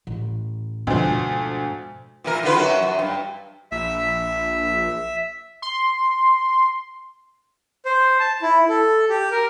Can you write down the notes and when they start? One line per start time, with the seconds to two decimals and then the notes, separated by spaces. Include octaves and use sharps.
0.07 A1
0.87 D2 G#2 B2 F3
2.24 A#2 E3 A#4
2.43 D3 F4 B4
2.56 F#2 F#4
2.82 F#2
2.99 G2
3.72 A#1 E5
5.62 C6
7.85 C5
8.19 A5
8.42 E4
8.69 A4
9.09 G4
9.31 A#4